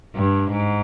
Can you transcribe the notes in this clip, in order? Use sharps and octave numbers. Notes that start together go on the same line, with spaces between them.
G2
G#2